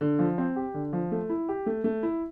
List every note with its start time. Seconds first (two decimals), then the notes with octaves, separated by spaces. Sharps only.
0.01 D3
0.19 F3
0.38 C4
0.56 G4
0.74 D3
0.93 F3
1.12 A3
1.29 E4
1.49 G4
1.66 A3
1.84 A3
2.03 E4